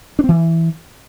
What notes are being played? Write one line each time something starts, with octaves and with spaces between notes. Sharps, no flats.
D4
C4
E3